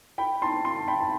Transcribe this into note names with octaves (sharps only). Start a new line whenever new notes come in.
G5 B5
A5 C6
A5 C6
G5 B5
A5